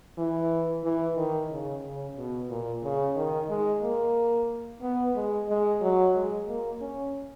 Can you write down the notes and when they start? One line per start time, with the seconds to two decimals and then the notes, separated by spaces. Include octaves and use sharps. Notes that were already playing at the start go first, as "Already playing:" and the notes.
0.18 E3
0.84 E3
1.17 D#3
1.50 C#3
1.83 C#3
2.17 B2
2.50 A#2
2.83 C#3
3.16 D#3
3.50 G#3
3.82 A#3
4.82 B3
5.15 G#3
5.49 G#3
5.81 F#3
6.15 G#3
6.48 A#3
6.81 C#4